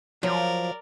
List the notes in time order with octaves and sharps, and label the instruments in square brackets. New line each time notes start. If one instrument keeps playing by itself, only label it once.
[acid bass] F3 [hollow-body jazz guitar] F#3 [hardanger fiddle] A#4 D5